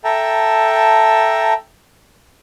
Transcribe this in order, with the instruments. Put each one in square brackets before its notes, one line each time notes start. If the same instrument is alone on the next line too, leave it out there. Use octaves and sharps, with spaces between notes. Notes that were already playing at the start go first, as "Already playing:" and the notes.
[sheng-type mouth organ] A4 E5 G5 A5 A#5